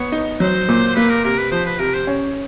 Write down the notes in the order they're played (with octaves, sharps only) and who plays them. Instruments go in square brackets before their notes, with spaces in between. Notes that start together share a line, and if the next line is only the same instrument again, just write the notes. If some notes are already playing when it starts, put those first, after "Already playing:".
Already playing: [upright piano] B3 [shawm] C#5
[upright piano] D#4
[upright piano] F#3 [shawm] C5
[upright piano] A#2
[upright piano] A#3 [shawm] B4
[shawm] A#4
[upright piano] C3 [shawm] A#4
[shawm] B4
[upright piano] F3 [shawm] C5
[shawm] B4
[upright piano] C3 [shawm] A#4
[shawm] C5
[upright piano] C#4